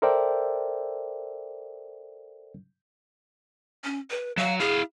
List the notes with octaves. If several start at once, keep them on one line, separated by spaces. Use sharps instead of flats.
A4 A#4 C5 D5 E5 G5
C#4
B4
F#3 F5
E4 G#4 F5